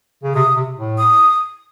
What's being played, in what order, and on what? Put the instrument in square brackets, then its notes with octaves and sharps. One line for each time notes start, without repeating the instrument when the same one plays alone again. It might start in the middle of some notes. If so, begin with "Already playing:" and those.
[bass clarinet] C#3
[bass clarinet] C3 [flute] D#6
[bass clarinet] C3
A2
[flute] D#6